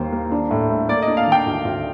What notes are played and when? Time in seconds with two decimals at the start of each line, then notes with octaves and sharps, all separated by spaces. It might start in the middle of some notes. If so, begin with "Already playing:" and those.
Already playing: D#2 A#3 C5
0.12 A#3
0.32 D4
0.51 A2
0.70 A3
0.89 A#3 D5
1.02 D#5
1.08 D4
1.17 F5
1.27 D#3 G5
1.46 D2
1.65 D2